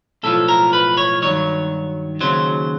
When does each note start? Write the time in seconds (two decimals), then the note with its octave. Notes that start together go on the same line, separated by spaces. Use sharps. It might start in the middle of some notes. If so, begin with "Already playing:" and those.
0.23 B1 A2 F3 A4
0.48 A#4
0.73 B4
0.97 C#5
1.22 G2 D#3 F#3 C#5
2.21 D#2 C#3 F#3 C5